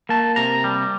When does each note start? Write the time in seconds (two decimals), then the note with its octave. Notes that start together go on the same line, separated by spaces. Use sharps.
0.09 A#3 A5
0.36 C3 A#5
0.64 G3